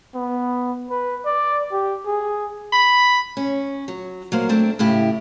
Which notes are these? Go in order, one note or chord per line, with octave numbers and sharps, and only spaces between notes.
B3
B4
D5
G4
G#4
B5
C#4
F#3
F#3 A#3 C5
A3 C4 D4
A2 C#3 E4 G4